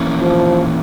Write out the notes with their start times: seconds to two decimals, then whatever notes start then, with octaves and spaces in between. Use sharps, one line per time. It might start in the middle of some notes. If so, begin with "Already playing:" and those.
Already playing: E3 A#3 C#4
0.20 F3